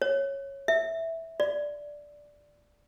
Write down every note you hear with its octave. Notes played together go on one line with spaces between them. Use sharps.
C#5
E5
D5